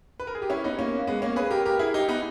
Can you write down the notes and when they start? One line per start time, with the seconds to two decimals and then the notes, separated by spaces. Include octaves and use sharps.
0.20 B4
0.27 A#4
0.35 G#4
0.42 G4
0.50 C#4 E4
0.64 B3 D#4
0.79 A#3 C#4
1.07 G#3 B3
1.22 A#3 C#4
1.36 G#4 B4
1.51 G4 A#4
1.66 G4 A#4
1.79 E4 G#4
1.94 D#4 G4
2.09 B3 D#4